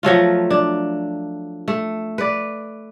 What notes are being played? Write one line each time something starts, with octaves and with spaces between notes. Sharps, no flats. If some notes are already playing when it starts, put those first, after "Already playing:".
F3 F#3 A3 F4
D4
A3
B4 D5